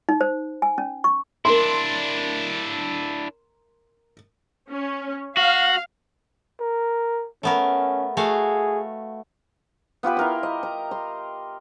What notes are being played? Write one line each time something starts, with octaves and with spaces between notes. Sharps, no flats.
D#4
C5
G#5
C#4
C#6
D4 E4 A#4 C6
C#4
F#4 F5
A#4
A3 B3 C#4 A#4
A3 F#4 G#4 F5
B3 F4 G4 B4
E4 A#4 C6
D#5
A#5
C6